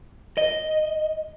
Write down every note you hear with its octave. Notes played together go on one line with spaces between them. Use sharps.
D#5